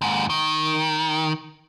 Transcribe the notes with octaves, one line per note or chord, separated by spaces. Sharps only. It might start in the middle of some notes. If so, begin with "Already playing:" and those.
D#2 G#2
D#3